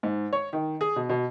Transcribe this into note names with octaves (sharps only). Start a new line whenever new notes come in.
G#2
C#5
D#3
G#4
B2
B2